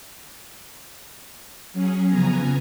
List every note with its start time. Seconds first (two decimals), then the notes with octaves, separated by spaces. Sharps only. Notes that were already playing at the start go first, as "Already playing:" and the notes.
1.73 F#3 C#4 G#4
2.09 F2 C#3 B3 G#5 A#5